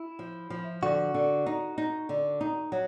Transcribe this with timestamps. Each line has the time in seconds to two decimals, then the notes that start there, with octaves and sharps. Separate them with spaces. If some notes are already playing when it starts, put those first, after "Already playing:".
Already playing: E4
0.19 F3
0.50 F3
0.83 D3 F#4
1.14 D3
1.46 D#4
1.78 D#4
2.09 D3
2.41 D#4
2.72 F#3